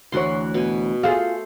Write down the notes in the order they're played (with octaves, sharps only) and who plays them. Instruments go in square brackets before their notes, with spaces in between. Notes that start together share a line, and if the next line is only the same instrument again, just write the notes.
[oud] D2 E3 C#5 [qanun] F#4 C6
[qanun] B2 G#5
[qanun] A3 A4 C5 [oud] F4 G#4